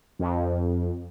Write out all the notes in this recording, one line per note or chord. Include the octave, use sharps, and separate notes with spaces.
F2